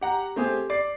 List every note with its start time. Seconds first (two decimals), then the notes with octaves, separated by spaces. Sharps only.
0.01 G4 F#5 A#5
0.36 A3 C4 G4 G#4
0.70 D5 C7